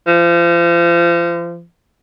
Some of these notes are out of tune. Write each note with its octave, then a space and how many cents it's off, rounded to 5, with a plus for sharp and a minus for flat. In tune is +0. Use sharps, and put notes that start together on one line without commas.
F3 -35